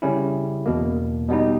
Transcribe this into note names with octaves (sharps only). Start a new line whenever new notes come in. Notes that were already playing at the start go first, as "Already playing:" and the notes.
C#3 G3 C#4 E4
E2 B2 A#3
B2 G3 B3 D#4